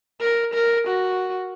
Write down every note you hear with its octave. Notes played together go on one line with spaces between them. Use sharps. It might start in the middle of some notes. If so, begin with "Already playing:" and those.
A#4
A#4
F#4